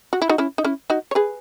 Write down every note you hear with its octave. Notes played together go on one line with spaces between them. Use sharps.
F#4
E4
D#4 F#4
C#4 E4
D#4
C#4 E4
D#4 F#4
C#5
G#4 B4